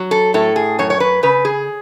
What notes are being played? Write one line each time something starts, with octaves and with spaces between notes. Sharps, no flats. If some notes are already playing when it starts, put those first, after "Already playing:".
Already playing: F#3
A4
A2 A4
G#4
F#2 C#5
C#5
B4
C#3 B4
G#4